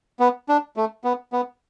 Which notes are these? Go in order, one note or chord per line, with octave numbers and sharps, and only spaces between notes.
B3
D4
A3
B3
B3